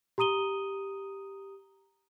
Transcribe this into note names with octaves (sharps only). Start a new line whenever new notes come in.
G4 A#5 D#6 D#7 G7